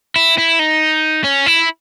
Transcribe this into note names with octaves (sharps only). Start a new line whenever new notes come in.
E4
E4
D#4
C#4
E4